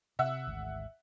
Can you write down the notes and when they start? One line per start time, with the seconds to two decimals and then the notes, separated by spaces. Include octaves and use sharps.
0.19 C3 E5 F#5 E6
0.47 G#1 D2